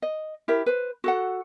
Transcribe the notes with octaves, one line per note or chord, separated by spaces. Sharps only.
D#5
E4 G4 A#4 E5
B4 C5
F#4 A4 F#5